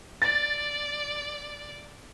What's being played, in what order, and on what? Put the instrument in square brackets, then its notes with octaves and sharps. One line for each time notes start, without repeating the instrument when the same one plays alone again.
[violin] D5 [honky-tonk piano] A6